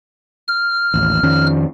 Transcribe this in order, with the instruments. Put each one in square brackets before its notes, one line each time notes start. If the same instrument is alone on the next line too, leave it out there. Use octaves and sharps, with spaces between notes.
[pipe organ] F6
[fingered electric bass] A1 D#2
F2 D#3 C#4